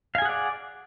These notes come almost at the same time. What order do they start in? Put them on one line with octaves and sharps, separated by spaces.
F5 G#5 G#4 F#5 D5